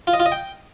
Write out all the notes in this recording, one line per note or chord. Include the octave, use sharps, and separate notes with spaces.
F4
D#5
F4
D#5
G5